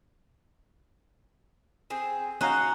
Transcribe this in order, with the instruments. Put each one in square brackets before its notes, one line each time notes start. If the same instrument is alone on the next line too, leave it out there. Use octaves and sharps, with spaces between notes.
[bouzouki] C4 G#4
[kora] C#4 D#4 F5 [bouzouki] F#4 F#5